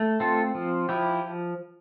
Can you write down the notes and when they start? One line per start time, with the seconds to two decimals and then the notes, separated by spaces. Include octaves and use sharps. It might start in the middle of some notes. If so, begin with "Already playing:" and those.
Already playing: A3
0.20 C4 F4 A4
0.55 F3
0.89 F3 E4 G4